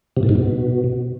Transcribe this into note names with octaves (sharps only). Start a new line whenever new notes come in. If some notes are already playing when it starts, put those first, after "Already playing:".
C3
A2
G#2
B2